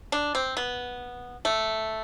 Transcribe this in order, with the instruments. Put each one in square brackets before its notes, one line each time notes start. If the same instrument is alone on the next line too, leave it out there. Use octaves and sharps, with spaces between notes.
[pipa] D4
C4
B3
A3